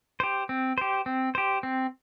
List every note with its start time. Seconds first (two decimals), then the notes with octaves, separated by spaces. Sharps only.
0.20 G4 C5
0.49 C4
0.78 G4 C5
1.06 C4
1.35 G4 C5
1.63 C4